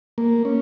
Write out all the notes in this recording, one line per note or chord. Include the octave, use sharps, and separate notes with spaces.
A#3
C#4